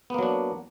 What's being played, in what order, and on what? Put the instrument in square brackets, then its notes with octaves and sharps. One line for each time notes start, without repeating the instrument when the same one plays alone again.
[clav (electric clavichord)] B3
A#3
F#3
D4